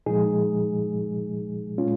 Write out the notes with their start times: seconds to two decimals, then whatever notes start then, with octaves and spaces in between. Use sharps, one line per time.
0.06 A#2 F3 G#3 D#4 G#4
1.78 A#2 G#3 C#4 F4